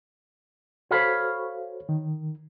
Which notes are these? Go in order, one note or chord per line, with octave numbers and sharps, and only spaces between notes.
F#4 A4 C5 C#5 F5 B5
D#3